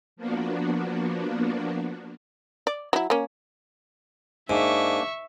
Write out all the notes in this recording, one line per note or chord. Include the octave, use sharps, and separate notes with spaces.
F3 A#3 B3 D4 F#4
D5
F#3 E4
A#3 C#4
G#2 A#3 D4 E5 C#6